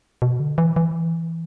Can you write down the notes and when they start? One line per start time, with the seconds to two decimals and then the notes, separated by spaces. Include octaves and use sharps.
0.22 B2
0.40 D3
0.58 E3
0.76 E3